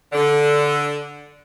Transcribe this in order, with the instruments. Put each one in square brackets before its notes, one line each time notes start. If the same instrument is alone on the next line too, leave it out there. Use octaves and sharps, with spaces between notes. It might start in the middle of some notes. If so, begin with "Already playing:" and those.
[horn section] D3